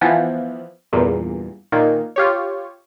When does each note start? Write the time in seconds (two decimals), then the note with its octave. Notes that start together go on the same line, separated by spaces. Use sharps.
0.01 E3 F3 B3
0.93 E2 G2 A#2
1.72 A#2 D#3 A#3
2.16 F4 G4 C#5